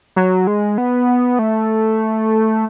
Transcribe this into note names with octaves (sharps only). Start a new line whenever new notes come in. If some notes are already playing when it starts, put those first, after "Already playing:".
F#3
G#3
B3
A3